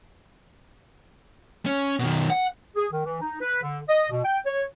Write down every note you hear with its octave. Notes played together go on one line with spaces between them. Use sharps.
C#4
B2 D#3
F#5
G#4
D#3
E3
D#4
B4
D3
D#5
B2
G5
C#5